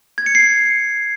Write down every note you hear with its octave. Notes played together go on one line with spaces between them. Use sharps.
G#6
C#7
C7